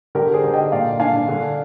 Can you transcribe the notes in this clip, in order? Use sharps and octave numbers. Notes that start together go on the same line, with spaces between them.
D3 G4 A#4
G#4 C5
D3
D#5 G5
A#2 D5 F5
D4 F5 G#5
D3